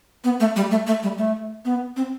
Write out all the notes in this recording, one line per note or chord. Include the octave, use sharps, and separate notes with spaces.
B3
A3
G3
A3
A3
G3
A3
B3
C4